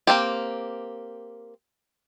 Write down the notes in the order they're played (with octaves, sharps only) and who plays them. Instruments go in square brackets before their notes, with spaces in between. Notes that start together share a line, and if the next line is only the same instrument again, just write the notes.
[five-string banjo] A#3 C4 G4